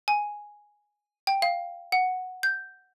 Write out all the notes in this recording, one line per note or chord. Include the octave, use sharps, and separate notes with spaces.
G#5
G5
F5
F#5
G6